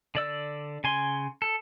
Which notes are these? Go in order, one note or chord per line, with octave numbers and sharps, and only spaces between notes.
D3 D5 E6
C#3 G#5 C6
A4